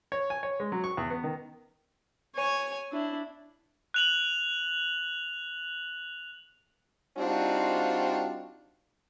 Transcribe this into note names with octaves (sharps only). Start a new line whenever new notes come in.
C#5
G#5
C#5
G#3
F#3
C#6
E2
B3
D#3
C#5 G#5
D4 E4
F#6 F7 F#7
G3 C4 D4 D#4 F4 F#4